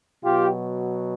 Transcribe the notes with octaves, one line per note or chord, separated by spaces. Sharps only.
B2 F#3 F4 G4